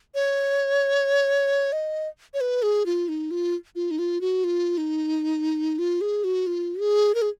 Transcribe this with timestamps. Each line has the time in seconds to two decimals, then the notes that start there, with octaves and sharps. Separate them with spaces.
0.15 C#5
1.73 D#5
2.34 C#5
2.41 B4
2.62 G#4
2.86 F4
3.08 D#4
3.31 F4
3.75 F4
3.91 D#4
3.99 F4
4.21 F#4
4.44 F4
4.78 D#4
5.79 F4
6.01 G#4
6.24 F#4
6.47 F4
6.80 G#4
7.15 A#4
7.22 G#4